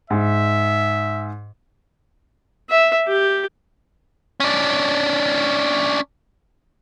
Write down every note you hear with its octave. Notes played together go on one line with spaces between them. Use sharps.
G#2 E5
E5
G4
C#4 D4